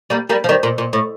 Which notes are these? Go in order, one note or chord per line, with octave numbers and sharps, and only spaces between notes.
G3 A#3
G3 A#3
F3
D#3 G3
A#2
A#2
A2